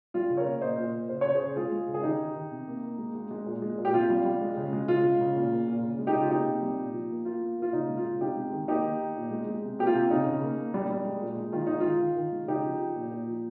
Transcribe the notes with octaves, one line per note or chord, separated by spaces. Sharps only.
G3 F4
C#3
A#4 C#5
A#3
A#2 C5 D#5
A#2
A#3
C#3 C5
C#3 C#5
G#4 C5
C#3
G#3 F4 G#4
G#3
C#3
G#4
D#3 D#4 G4
D#3
D#3
C3
A#3
A#3
G#3
G#3
G#3
A#2
G#3
A#2
G4
C3 F4
G3
G3
G#3
C#3
G#3
C#3 F4
G#3
C#3
A#2
A#3
A#2
C#3
G#3
D#4 G4
C#3 F4
A#3 D#4 G4
C3
G3
A#2
F3
A#3
A#3 F4
A#3
A#3 F4
C#3 D#4
G#3
F4
C#3
C3 D#4 G4
G#3
D#3
A#3 D#4 G4
D#3
A#3
A#2
G#3
G#3
C3
A#3 G4
F4
C3
C#3 D#4
C#3
A#3
A#3
G3
G3
G#3
A#2
G#3
D#3 F4
G#3 D#4
D#3 F4
D#3
D#3
G#3
C#3 D#4 G4
F3
F3
A#2
A#2
F3